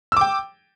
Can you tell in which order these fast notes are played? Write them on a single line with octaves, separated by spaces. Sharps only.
E6 D6 G5